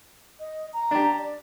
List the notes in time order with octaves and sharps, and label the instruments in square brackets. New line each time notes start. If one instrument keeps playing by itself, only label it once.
[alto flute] D#5
A#5
[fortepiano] D4 G4
[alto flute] D5